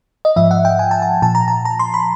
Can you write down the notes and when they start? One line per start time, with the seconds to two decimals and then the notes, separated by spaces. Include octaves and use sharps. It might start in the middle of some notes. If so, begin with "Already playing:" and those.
0.25 D#5
0.36 G#2 F3 E5
0.51 F#5
0.65 G5
0.79 G#5
0.91 A5
1.02 G#5
1.22 A#2 F3 A5
1.35 A#5
1.48 A5
1.65 A#5
1.79 C6
1.94 B5